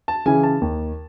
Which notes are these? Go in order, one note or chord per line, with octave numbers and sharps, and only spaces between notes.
A5
C#3 E3 G#5
A5
D#2